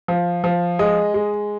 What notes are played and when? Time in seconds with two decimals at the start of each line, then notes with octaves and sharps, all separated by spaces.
0.08 F3
0.44 F3
0.79 G#3 D#5
1.14 G#3